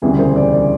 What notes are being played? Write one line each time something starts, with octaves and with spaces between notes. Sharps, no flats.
E1 D2 C#3 E3 G3 G#4
C5
D5
D5